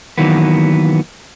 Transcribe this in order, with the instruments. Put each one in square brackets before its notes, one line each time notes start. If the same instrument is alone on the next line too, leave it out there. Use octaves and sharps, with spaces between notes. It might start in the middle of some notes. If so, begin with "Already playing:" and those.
[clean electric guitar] D#3 E3 F#3 A#3 B3